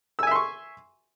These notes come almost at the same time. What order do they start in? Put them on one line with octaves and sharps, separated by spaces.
E6 G#5 E5 C6 C#6